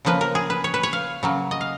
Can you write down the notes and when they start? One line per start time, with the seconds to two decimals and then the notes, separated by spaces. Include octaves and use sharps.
0.05 C#3 F3 A#3 B4
0.21 A#4
0.35 G#4
0.50 B4
0.64 C#5
0.74 B4
0.83 C#5
0.93 F5
1.23 C#3 F#3 A#3
1.51 D#5
1.61 F5